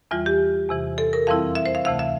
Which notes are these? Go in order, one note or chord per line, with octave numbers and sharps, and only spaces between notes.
E2 E3 G3 F4
G4
E2 C3 E3
A4
A#4
F2 E3 G3 C4 E4 F5
E5
C5
F5
D2 C3 E3 A3 F5
E5